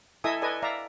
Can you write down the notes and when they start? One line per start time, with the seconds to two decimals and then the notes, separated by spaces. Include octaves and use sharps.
0.24 E4 A4 D#5 E5 G#5 D#6
0.42 A4 B4 D5 D#5 G#5 A5
0.62 D5 E5 F5 A#5